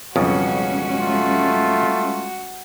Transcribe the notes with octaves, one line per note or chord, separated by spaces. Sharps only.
B1 F2 C#3 G3 G#3 C#4 F#4
A3 F4